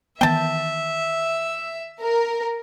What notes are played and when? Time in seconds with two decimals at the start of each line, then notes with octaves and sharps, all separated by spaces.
0.21 D#3 E3 B3 E5 G5 A5
2.01 A#4